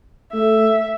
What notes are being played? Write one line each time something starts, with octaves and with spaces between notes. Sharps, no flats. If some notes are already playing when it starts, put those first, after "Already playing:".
A3 E5